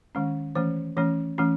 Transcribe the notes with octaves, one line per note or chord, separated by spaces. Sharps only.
D#3 G#3 C#4
E3 A3 C#4 C5
E3 A3 C#4 C#5
E3 A3 C#4